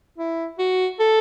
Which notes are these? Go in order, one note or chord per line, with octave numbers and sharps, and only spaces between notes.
E4
F#4
A4